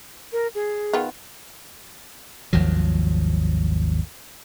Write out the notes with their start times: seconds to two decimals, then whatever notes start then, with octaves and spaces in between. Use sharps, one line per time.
0.33 A#4
0.55 G#4
0.93 D#3 B3 F4
2.53 G#1 D#2 F3 F#3